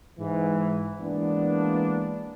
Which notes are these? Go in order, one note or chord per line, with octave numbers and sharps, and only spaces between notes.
G#2 E3
E3 G#3 A#3 B3 D4